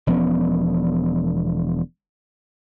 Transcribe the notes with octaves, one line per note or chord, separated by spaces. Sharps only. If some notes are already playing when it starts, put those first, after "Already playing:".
E1 F3 B3 C#4